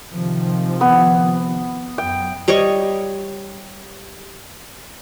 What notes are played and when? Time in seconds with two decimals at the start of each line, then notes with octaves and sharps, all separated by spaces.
0.11 C3 D#3 F3
0.81 B3
1.98 F#2 G5
2.48 G3 C#5 D#5 C#6